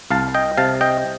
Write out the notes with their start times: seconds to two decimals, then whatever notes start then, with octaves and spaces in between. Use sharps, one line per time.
0.10 C2 F5 A5
0.34 D#5 G5
0.57 C3 F5 A5
0.81 D#5 G5